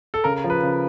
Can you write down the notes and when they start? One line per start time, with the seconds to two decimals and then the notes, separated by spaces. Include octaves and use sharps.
0.14 A4
0.24 C#3 A#4
0.44 F3
0.50 B4
0.63 C#3